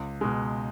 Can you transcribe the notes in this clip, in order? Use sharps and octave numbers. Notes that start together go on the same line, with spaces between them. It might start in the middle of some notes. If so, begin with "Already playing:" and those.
Already playing: C#2
B2 G#3